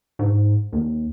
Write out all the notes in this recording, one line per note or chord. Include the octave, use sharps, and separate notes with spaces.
G#2
D#2